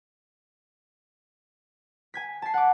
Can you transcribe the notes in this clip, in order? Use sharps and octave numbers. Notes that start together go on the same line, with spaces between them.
G#5 G#6 B6
A5 C7
F#5 D6